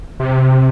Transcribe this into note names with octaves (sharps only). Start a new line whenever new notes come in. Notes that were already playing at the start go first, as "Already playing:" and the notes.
C3